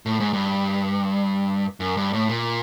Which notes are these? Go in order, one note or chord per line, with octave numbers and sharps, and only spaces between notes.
A2
G#2
G2
F#2
G2
A2
A#2